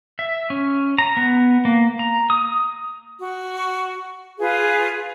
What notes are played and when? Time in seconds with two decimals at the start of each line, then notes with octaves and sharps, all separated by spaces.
0.19 E5
0.50 C#4
0.98 A#5
1.17 B3
1.65 A#3
1.99 A#5
2.30 D#6
3.19 F#4
4.40 F4 G#4 B4 F5